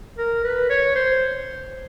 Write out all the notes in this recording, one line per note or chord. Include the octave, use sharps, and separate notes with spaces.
A#4
B4
C#5
C5